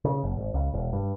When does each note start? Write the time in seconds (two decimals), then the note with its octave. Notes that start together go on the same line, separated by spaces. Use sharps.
0.05 C#3
0.23 F#1
0.37 G#1
0.54 C#2
0.73 E1
0.93 G2